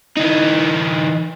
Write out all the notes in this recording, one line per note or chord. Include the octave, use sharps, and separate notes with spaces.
E3 D#4